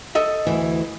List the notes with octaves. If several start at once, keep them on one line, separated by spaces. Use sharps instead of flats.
A4 D#5 E5
D2 E3